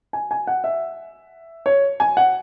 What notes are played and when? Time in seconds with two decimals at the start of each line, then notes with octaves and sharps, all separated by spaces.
0.13 G#5
0.31 G#5
0.47 F#5
0.64 E5
1.66 C#5
2.00 G#5
2.17 F#5